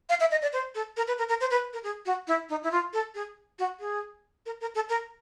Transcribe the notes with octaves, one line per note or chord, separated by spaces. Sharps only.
F5
E5
D#5
D5
C5
A4
A#4
B4
A#4
A#4
C5
B4
A#4
G#4
F#4
E4
D#4
E4
F4
A4
G#4
F#4
G#4
A#4
A#4
A4
A#4